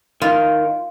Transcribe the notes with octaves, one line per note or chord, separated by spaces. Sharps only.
D#3 F4